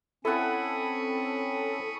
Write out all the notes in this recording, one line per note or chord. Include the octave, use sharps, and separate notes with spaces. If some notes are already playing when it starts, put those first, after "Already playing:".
C4 C#4 E4 A4 F#5 B5 C#6 D#6